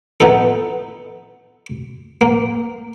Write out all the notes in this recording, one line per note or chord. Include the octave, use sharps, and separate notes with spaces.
B3 D#4 E4 A4
A#3